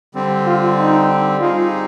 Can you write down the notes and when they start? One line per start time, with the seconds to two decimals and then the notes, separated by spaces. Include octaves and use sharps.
0.15 D3 G3 C4
0.46 F4
0.78 D#4
1.40 G3 C4 D#4 F4 G#4